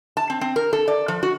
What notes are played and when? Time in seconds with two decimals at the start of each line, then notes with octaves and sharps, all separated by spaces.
0.17 A5
0.30 C4
0.41 C4
0.56 A#4
0.73 A4
0.88 D5
1.08 F3
1.23 F#4